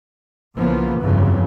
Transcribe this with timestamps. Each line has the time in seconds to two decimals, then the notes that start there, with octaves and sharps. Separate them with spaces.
0.56 B1 C#3 E3 F3 A#3 B3
1.01 G1 F2 C#3 E3 F#3